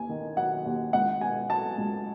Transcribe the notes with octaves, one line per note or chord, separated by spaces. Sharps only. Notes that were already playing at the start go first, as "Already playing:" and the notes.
Already playing: D#2 G#5
D#3
F#3 F#5
D#2
C#2 F#5
B2 G#5
F#3 A5
C#2